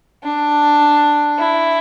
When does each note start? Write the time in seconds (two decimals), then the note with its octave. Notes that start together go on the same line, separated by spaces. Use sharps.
0.24 D4
1.38 E4